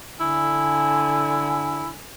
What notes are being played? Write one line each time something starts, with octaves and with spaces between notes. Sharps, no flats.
D3 E4 G#5